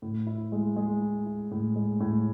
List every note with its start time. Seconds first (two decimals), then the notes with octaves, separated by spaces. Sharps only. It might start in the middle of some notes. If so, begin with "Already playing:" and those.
0.02 A2
0.27 E4
0.52 G#3
0.76 G#3
1.01 E4
1.26 E4
1.51 A2
1.76 G#3
2.00 A2